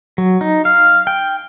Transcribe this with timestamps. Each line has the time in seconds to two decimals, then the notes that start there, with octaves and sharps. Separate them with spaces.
0.18 F#3
0.41 D#4
0.65 F5
1.07 G5